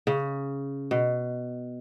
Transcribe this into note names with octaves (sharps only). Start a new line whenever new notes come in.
C#3
B2